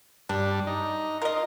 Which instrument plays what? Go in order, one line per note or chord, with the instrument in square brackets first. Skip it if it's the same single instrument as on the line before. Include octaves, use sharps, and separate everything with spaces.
[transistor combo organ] G2 G3 [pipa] D4
[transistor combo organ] D#4
[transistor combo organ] F4 [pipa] A#4 D#5